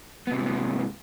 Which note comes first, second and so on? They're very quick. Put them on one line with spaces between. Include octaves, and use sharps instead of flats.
B3 C3 G#2 E3